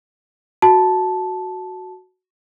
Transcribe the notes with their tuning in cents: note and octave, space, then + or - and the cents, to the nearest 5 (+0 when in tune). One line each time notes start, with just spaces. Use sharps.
F#4 +0 A5 -10